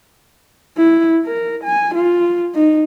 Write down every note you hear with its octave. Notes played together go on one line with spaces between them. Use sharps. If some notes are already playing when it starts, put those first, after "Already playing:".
E4
A#4
G#5
F4
D#4